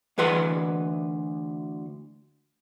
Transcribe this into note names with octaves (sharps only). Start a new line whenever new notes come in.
D2 E3 B4 F#5 C6